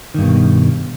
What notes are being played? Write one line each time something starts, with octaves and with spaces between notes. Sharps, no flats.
G2 B2 D#3